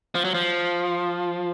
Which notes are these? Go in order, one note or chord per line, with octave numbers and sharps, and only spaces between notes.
F3
F#3
F3